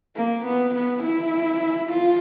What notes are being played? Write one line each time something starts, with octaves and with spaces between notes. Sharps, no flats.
A#3
B3
B3
E4
F4